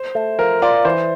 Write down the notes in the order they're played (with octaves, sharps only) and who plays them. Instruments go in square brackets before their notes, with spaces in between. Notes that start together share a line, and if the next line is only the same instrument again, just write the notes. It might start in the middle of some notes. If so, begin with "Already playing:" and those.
Already playing: [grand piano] C5
[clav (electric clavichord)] A3
[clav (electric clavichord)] F3 [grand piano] A#4
[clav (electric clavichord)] F4 [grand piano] D5
[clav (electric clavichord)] E3 [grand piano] C5